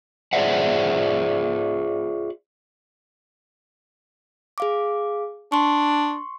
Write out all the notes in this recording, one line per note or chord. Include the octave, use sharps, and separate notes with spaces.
F4 G#4 C5 D5 E5 F#5
G#4 F5 D6
D4 C6 C#6